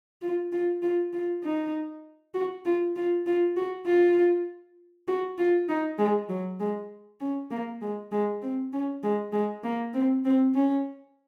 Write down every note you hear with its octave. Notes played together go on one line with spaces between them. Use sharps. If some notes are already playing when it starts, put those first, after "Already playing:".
F4
F4
F4
F4
D#4
F#4
F4
F4
F4
F#4
F4
F#4
F4
D#4
G#3
F#3
G#3
C#4
A#3
G#3
G#3
C4
C#4
G#3
G#3
A#3
C4
C4
C#4